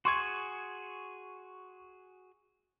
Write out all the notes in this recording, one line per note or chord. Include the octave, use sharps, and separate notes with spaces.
F#4 G#4 C6 C#6 G#6